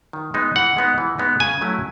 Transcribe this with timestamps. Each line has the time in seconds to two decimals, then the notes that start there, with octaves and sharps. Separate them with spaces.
0.13 D#3
0.34 G#3 B3 D#4
0.56 E3 F#5
0.77 G#3 B3 D#4
0.98 E3
1.19 G#3 B3 D#4
1.40 C#3 G#5
1.61 F#3 A3 C#4 E4